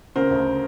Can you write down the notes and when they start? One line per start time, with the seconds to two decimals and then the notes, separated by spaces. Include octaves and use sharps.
0.15 C#3 A#4 C5
0.30 D2